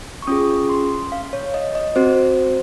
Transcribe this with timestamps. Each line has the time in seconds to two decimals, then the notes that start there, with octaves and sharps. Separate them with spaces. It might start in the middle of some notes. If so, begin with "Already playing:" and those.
0.22 C#6
0.27 C#4 F4 G#4 D#6
0.69 C6
1.12 F5
1.33 C#5
1.54 D#5
1.75 D#5
1.96 C4 F#4 C5